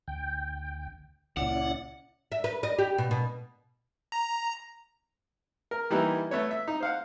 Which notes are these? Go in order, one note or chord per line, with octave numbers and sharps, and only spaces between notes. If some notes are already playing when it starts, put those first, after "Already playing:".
D2 G5
C#2 A#2 C#4 E4 D5 F#5
E5
B4
D#5
G4
B2
B2
A#5
A#4
E3 G3 A#3 B3 D#4 E4
A3 B3 C#5
E5
D#4
C5 F5 F#5